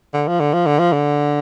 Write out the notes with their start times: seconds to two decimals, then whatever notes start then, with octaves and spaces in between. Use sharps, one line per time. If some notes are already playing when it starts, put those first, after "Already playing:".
0.14 D3
0.27 F3
0.40 D3
0.54 F3
0.66 D3
0.79 F3
0.92 D3